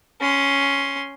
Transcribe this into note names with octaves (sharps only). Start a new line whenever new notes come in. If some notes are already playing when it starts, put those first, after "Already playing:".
C#4 C6